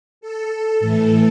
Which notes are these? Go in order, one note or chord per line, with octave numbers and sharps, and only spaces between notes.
A4
A2 E3